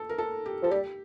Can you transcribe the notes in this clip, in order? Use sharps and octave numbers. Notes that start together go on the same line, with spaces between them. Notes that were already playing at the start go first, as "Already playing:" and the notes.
Already playing: A4
A#4
A4
G4
F3 A4
G3 G4